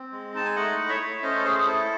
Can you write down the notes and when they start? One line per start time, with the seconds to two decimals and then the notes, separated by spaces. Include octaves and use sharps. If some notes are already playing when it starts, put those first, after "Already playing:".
Already playing: C4
0.12 G#3
0.34 D#4 A5
0.46 G#5
0.56 A3 D#5 F#5
0.79 E4
0.89 C#5 E5
1.00 A3
1.22 C#4 C5 D#5
1.36 A4
1.45 A3 G#4 C5
1.58 G#4
1.66 E4 A4